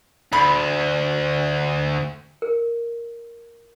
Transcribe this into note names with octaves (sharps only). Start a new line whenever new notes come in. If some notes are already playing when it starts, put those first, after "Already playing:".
D2 B5
A#4